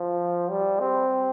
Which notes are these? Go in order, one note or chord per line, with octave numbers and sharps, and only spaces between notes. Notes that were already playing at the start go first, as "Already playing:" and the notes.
Already playing: F3
G3
C4